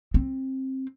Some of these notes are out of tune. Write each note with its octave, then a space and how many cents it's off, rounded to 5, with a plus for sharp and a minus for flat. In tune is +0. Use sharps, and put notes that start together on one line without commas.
C4 +20